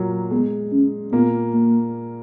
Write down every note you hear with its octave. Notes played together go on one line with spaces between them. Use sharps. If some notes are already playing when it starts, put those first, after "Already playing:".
Already playing: A#2 F#3 A#3
G#3 B3
C#4
A#2 A#3 B3
A#3